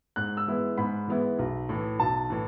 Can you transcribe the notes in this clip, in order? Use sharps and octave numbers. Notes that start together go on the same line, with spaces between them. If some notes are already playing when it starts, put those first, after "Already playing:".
G#2 F#6
E6
E3 G#3 B3 E4
G#2 B5
E3 G#3 B3 E4
B1
A2 E3
B1 A5
A2 E3